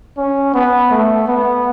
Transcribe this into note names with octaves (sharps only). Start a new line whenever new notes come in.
C#4
B3
A3
B3